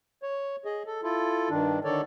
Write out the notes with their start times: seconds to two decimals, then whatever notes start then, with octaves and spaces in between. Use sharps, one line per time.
0.23 C#5
0.65 G#4 D#5
0.86 A4
1.03 E4 F4 A4
1.50 G2 D#3 D4
1.84 D3 D#3 A4 C#5 D5